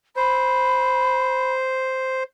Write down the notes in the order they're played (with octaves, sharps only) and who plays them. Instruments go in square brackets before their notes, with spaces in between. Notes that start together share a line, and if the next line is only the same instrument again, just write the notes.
[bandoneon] C5 [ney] B5